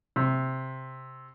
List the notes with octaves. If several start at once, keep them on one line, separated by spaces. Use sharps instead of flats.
C3